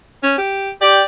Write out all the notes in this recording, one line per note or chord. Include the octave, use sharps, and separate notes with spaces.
C#4
G4
G4 D5